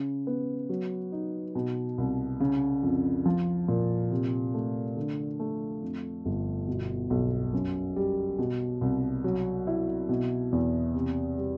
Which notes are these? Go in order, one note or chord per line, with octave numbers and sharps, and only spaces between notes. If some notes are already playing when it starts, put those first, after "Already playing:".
Already playing: C#3
B3
F#3
D#4
B2
C2
C#3
F2
F3
A#2
C3
A3
D3
A3
F2
G1
B2
B1
F#2
G3
B2
C2
F#3
E4
B2
E2
C3
G3